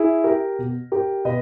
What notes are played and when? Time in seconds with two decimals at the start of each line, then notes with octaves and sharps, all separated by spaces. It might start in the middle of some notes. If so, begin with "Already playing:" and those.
Already playing: E4 G#4
0.24 G4 A#4
0.59 B2
0.92 G4 A#4
1.25 B2 B4 D#5